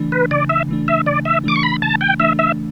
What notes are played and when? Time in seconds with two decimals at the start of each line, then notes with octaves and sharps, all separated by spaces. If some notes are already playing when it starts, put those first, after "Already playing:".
Already playing: C#3 E3 A3 D4
0.12 B4
0.31 C#3 D5
0.49 E5
0.68 E3 A3 D4
0.88 E5
1.06 C#3 D5
1.25 E5
1.44 E3 A3 D4 D6
1.56 C#6
1.63 B5
1.82 C#3 A5
2.01 G5
2.20 E3 A3 D4 E5
2.39 E5